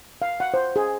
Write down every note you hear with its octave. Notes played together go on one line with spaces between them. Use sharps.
F5
F#5
C5
G#4